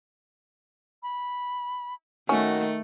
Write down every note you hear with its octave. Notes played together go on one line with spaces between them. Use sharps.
B5
D#3 A3 C#4 F#4